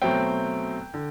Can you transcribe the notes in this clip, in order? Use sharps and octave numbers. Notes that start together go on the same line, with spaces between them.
B2 F#3 A3 C4 G5
D3